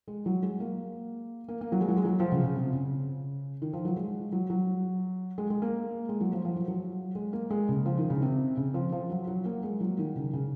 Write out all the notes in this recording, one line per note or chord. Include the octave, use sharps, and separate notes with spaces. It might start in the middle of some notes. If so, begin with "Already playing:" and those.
G#3
F#3
G#3
A#3
A#3
A#3
F#3
G#3
F#3
G#3
F#3
F3
C#3
C#3
C3
C#3
D#3
F3
F#3
G#3
F#3
F#3
G#3
G#3
A#3
G#3
F#3
F3
F3
F#3
F#3
G#3
A#3
G#3
C#3
F3
D#3
C#3
C3
C#3
F3
F3
F#3
F#3
A#3
G#3
F#3
D#3
C#3
C#3